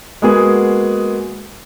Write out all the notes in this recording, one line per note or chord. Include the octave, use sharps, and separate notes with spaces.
G#3 A#3 B3 F#4 G#4